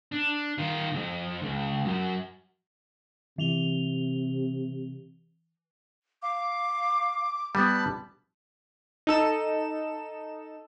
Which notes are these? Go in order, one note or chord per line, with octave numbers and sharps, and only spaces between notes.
D4
D#3 F4
C2 F2
C#2
F#2
C3 E3 F7 G7
F5 D6
G3 B3 A5 B5
D#4 A4 E7